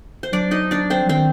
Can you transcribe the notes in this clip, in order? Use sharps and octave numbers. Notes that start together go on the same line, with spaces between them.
C5
F#3 D4 D5
D#4 D#5
D4 D5
C4 C5
F#3
D#3 C4 C5